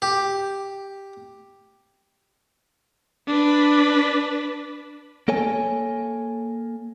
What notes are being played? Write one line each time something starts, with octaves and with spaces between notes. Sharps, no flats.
G4
D4 B4
A#3 A4 C#5 G#5